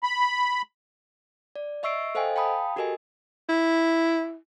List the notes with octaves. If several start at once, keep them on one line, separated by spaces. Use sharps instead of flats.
B5
D5
D#5 E5 C#6 E6 C7 D7
A4 C5 D#5 F5 G5 G#5
F5 G5 A5 B5 D#6
F#4 G4 A4 A#4 D#5 G#5
E4